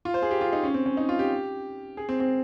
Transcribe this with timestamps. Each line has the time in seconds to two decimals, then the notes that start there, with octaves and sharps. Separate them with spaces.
0.05 F4
0.14 C5
0.22 G#4
0.31 G4
0.41 F4
0.53 D#4
0.63 C#4
0.74 C4
0.86 C#4
0.97 D#4
1.09 F4
1.19 G4
1.97 G#4
2.09 C4
2.20 C4